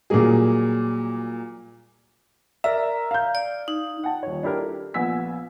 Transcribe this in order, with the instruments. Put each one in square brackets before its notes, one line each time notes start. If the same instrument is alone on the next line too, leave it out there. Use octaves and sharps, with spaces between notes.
[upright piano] A#2 F#3 G3 A#3 G#4
[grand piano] A#4 D5 E5 [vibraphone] A#5
[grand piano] F5 G6
[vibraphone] D5
D#4
[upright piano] F#5 G5 A5
D#1 C#5
D4 E4 G4 A#4
A4
A#1 B3 G#5 E6 B6